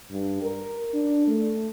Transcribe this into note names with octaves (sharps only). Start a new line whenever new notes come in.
G2
A#4
D4
A3